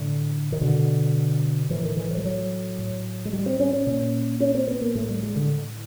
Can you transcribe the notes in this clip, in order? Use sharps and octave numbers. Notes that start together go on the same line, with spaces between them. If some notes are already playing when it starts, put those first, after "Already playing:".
Already playing: A2 D3
D#3
B2 D3
A2 E3
D#3
E3
F3
G3
F#3
A2
G#3
G3
C4
C#4
C#4
A#2
C#4
C4
B3
A#3
A2 A3
G3
G#3
D3